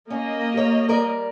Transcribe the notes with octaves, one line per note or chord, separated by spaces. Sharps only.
A#3 C#4 D#5
G4 C#5
G3 A#4 D5